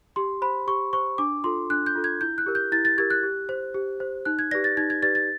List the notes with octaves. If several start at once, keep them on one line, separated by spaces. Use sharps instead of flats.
G4 C6
C5 B5
G4 C#6
C5 C#6
D4 D6
F4 A4 C6
D4 F#6
G6
F4 A4
G#6
E4 G6
F#6
G4 A#4
G6
E4 A6
A6
G4 A#4 G#6
F#6
G4
C5
G4
C5
D#4 F#6
G#6
G4 B4 D5 A#6
A6
D#4 G#6
G#6
G4 B4 D5 A6
A6